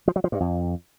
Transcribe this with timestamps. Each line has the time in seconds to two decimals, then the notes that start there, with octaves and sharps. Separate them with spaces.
0.08 F3
0.16 F#3
0.24 F3
0.32 G2
0.40 F2